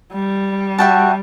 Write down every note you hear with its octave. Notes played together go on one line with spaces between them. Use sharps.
G3
F#4 E5 G5 A5